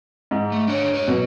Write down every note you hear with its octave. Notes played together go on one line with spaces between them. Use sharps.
G#2
A3
D4 G#4 C#5
A#4 C#5
B2 F#3